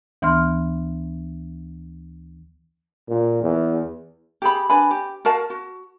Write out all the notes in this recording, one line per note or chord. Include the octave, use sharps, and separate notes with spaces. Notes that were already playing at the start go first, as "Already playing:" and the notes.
D2 E3 B3 C6 F6
A#2
E2
G4 G#4 B5
D4 B4 G#5 B5
G4
F#4 A#4 F5 A5
F#4